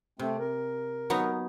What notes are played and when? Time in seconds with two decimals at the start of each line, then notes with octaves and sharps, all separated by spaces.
0.19 C3 A3 C4
0.39 A#4
1.10 F#3 B3 D#4